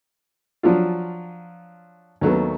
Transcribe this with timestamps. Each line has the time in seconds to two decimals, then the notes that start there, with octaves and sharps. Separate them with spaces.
0.63 F3 F#3 D4 F4
2.21 D#2 F#3 A3 B3